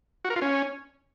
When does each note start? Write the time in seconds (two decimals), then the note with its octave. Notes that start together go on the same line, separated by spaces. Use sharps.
0.25 F#4
0.30 A#4
0.36 F4
0.42 C#4